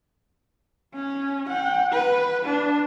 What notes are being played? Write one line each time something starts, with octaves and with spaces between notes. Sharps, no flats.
C#4
F#5 G5
B4
D4